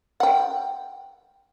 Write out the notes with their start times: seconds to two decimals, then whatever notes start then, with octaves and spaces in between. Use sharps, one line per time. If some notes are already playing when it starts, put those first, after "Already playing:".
0.20 F#5 G5